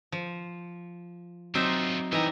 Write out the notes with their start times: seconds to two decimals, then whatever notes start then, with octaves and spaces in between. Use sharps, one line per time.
0.12 F3
1.55 F#3 C4 D4 D#4 F4 C5 E5
2.13 E3 G3 D#4 D#5 E5 G5 A#5